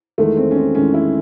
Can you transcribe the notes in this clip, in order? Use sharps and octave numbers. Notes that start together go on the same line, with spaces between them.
E2 D#3 G#3 A3
C4
C#4
C4
E2 D#3 G#3 C#4
E4